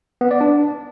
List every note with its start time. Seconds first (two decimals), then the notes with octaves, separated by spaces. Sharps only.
0.21 B3
0.31 D5
0.41 D4